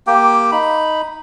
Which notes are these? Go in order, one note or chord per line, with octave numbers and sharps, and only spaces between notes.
A#3 G4 G5
D#4 B5